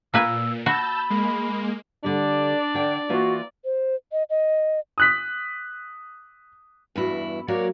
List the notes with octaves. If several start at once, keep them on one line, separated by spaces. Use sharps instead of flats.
A#2 A#3 B4 G#5 E6
F#4 A5 B5 E6 G6
G#3 A#3
D3 G3 D4 D5
D3 G5
E3 A#3 F4 F#4
C5
D#5
D#5
D#6 F#6 B6
E2 G2 E4 F#4
F#3 A#3 F#4 A#4 C#5 D5